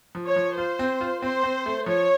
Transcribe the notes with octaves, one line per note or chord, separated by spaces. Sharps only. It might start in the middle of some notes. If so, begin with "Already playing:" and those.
F3
C#5
F3
F4 C5
C4
F4
C4 C5
C4
A3
F3 C#5